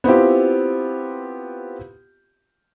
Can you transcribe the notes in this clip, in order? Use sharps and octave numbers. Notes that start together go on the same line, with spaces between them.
B3 C4 E4 F4 G4